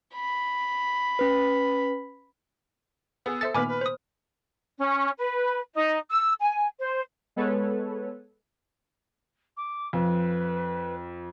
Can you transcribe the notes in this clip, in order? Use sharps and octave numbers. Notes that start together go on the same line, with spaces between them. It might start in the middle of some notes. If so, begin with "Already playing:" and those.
B5
C#4 B4
B3 G#4 E6
A4 C5 E5 A6 C#7
A#2 D#3 B3 B4 G#5 B5 D6 F6
B4
C5 D#6
C#4
B4
D#4
E6
G#5
C5
G#3 B3 A4 B4 C#5
D6
F2 F3 B4